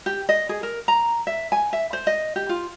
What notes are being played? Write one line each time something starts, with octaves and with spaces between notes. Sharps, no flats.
G4
D#5
G#4
A#4
A#5
E5
G#5
E5
C5
D#5
G4
F4